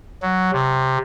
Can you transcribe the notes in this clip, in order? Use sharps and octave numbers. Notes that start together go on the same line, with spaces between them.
F#3
C3